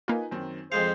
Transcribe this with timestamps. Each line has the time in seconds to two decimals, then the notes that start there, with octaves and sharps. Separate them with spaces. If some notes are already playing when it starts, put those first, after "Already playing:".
0.08 A#3 D#4 F4 B4 G#5
0.31 F#2 D#3 C4
0.72 F2 G#3 G#4 C5 F5